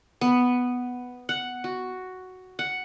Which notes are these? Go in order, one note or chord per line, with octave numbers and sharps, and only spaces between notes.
B3
F#5
F#4
F#5